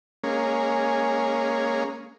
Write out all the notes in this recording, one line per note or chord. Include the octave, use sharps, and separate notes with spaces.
G#3 A#3 C#4